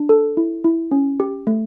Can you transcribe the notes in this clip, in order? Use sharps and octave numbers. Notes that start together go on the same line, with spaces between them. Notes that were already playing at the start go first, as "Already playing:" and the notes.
Already playing: D4
A4
E4
E4
C#4
G4
A3